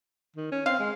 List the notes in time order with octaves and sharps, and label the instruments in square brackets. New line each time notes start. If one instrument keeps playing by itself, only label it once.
[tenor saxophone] D#3
C#4
[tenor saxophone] C4 [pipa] F5
[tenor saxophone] G#3